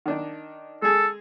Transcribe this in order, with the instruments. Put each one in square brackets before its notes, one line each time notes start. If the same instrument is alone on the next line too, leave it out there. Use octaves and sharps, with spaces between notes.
[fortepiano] D#3 D4 D#4
[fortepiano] G#3 G#4 [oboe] A4